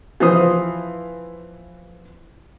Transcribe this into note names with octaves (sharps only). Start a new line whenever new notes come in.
E3 F3 C5 D#6